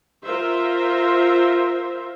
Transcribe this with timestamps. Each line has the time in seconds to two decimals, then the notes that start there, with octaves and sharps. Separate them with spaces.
0.24 F4 A#4 C5 E5